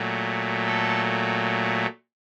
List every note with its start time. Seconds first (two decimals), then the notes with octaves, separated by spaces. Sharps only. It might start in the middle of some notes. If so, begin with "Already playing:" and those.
Already playing: A#2 F#3 A3
0.66 A4